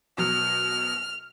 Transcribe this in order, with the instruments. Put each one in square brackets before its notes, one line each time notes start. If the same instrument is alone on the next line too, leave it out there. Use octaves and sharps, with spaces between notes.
[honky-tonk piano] B2 F#3 [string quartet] F6